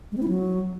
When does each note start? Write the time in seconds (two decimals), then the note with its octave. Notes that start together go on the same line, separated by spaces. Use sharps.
0.12 G#3
0.17 C4
0.23 E4
0.28 F#3